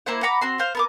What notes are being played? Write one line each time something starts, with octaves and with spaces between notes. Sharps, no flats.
A#3 E4 C5 F#5
F#5 A#5 B5 D6
C4 F#4 C6
C5 F5
B3 A#4 D6